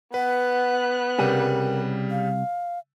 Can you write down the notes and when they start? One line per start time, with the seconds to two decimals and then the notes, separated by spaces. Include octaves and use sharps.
0.14 B3 B4 F#5 F#6
1.18 C2 C#3 G3 G4 A#4 G5 D#7
2.11 F5